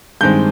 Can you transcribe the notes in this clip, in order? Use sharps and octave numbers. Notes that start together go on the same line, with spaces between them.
G2 D#3 G#3 C4 G6